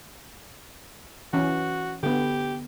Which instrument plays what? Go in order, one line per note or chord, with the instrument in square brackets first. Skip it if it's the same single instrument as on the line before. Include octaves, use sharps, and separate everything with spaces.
[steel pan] E3 C#4 [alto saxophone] F#4
[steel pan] D3 B3 [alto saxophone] G4